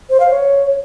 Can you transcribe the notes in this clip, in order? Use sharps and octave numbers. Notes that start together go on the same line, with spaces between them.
C5
F5
C#5